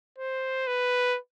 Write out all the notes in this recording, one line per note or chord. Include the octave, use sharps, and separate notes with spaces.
C5
B4